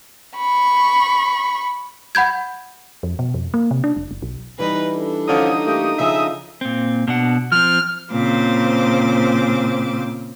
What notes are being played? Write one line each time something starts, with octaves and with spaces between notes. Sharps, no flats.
B5 C#6
F#5 B5 G6 G#6
F2
B2
F2
A#3
C3
D4
F1
F#1
B1
E3 G3 D#4 B4
D4 A4
D3 F3 C#4 D#4 D#6
A3 A#3 G4
C#3 F3 G#4 D#5 E5
A#2 C4
B2 D4 F#5
F3 C4 F6
A#2 C#3 C4 C5 D6